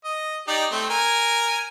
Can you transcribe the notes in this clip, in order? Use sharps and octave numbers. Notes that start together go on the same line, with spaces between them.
D#5
D#4 G4 D5
A3 C4
A#4 G#5